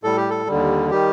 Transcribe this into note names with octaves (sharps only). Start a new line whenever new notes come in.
A2 G3 A4
G4
A4
D#2 D3 G3
D#3 G3 G4